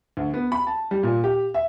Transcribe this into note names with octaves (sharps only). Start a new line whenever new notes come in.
D2
B3
B5
A5
G3
A#2
G4
E5